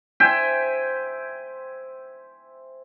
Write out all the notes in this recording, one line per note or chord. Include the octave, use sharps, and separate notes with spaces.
C5 E5 G5 G#5